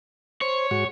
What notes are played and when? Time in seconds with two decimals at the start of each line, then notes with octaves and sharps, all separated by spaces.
0.41 C5 C#5
0.71 G#2 F#4 C#6